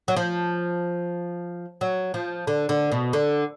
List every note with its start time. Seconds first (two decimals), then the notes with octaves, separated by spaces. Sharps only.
0.08 F#3
0.16 F3
1.81 F#3
2.14 F3
2.47 D3
2.69 D3
2.92 B2
3.13 D3